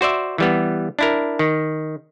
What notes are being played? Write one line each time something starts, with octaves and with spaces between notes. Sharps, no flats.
F#4 C5 D5 E5
E3 G3 B3
D4 E4 A#4
D#3